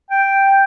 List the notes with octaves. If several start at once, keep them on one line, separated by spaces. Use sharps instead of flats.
G5